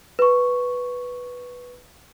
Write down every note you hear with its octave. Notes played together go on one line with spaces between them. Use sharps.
B4 C#6